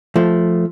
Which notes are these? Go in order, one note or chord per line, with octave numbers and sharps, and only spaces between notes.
F3 A3